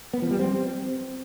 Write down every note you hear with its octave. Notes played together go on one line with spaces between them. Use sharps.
B3
F3
G3
C4